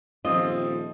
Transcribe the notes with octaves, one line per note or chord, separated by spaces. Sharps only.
D#1 F3 C4 F4 D#5